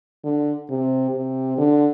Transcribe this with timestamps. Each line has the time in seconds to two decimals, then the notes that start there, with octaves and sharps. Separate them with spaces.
0.24 D3
0.70 C3
1.11 C3
1.58 D3